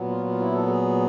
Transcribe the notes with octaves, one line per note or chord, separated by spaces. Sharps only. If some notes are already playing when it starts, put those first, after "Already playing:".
Already playing: A#2 F#3 B3
F4
F4
E4
A4
G#4